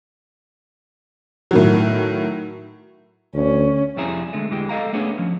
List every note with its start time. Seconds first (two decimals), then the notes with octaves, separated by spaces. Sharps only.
1.51 A2 D#3 F#3
3.34 D2 C#4
3.96 C2 F2 C3 E4 G#4 A#5
4.33 D3 G#3 A3
4.50 E2 E3 G#3 G4
4.69 A4 D#5 F5 A#5
4.93 A3 B3 C#4 D4 G#4
5.18 F3 C#4